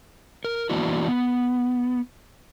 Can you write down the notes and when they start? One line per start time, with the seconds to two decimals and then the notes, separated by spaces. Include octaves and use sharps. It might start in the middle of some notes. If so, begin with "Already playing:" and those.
0.44 A#4
0.70 E3 A#3 B3 D4 E4 F#4
1.08 B3